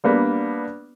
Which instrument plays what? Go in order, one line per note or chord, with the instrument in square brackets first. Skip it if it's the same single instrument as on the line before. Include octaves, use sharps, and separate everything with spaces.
[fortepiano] G3 A#3 B3 D4